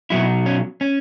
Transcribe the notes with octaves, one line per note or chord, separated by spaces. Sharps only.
B2 F#3 E4
C#4
C#4